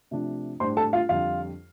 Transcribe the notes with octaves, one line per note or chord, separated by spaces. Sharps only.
C3 F3 A3 D4
A2 G3 D4 C5 C6
A4 A5
F4 F5
F2 D3 G3 F4 F5